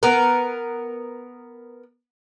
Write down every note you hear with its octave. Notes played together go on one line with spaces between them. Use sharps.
B3 A#4